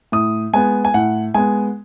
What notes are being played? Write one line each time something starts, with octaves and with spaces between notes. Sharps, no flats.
A2 D#6
G#3 B3 G#5
G#5
A2 F#5
G#3 B3 G#5